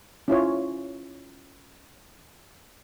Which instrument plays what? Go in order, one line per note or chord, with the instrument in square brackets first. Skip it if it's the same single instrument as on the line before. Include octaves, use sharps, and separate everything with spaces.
[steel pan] C#4 E4 F4 C#5